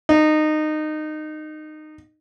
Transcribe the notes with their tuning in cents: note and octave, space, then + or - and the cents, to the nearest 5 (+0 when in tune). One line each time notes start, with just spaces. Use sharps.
D#4 -20